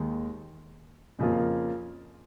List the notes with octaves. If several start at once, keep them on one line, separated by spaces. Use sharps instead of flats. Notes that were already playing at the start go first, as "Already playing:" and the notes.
Already playing: D#2 D#3 G#3
F2 C#3 F3 A#3 F4